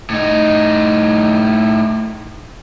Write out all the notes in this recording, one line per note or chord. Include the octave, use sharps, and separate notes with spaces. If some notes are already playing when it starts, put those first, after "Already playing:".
A2 D#4